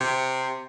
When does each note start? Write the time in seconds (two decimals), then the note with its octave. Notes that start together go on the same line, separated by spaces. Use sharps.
0.01 C3